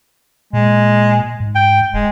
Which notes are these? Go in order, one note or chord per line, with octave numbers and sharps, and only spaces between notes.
A#2 G#3
G#2
G5
E1 G#3